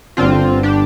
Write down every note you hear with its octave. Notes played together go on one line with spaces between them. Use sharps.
G1 G2 D3 C4 F4
D4 G4